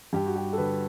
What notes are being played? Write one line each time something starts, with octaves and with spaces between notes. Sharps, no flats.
G2 G4
F#4
G4
A4
D3 B4